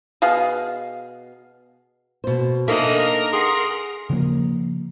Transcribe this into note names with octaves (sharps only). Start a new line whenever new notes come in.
B2 G#4 F5
B2 C5
A#3 D4 D#4 G#4 A4 D#5 E5
A#4
G#4 F#5 C6
C#3 F3 A#3